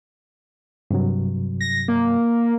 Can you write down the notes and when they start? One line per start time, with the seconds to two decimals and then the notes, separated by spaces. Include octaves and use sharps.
0.91 G2 C3 F#3
1.61 A#6
1.88 A#3